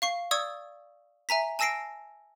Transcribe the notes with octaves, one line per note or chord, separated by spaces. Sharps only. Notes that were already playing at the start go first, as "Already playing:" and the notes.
F5 C#6 C7
D5 C#6 D#6 E6 G#6
E5 G#5 A#5 B6
G#5 A5 E6 A#6 C7 D7